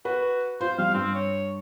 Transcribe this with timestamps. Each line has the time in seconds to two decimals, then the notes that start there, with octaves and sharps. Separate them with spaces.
0.05 F#4 B4
0.61 F4 C5
0.78 G3 F5
0.94 G2 C4
1.14 C#5